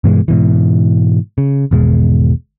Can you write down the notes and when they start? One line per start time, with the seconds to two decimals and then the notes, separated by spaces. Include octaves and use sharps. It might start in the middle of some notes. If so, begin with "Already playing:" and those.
0.04 G2 B2 E3 G#3
0.28 G#2 B2 E3
1.38 C#3
1.71 G#1 E2 B2 G#3